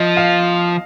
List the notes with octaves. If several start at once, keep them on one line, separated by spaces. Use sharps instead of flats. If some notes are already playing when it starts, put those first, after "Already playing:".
Already playing: F3 D#5
F5